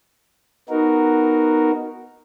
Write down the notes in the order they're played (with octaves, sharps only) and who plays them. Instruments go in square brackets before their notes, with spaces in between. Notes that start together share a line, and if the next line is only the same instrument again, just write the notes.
[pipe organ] B3 D#4 F#4 A#4